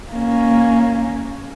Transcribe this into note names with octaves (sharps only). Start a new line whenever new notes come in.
A#3 C#4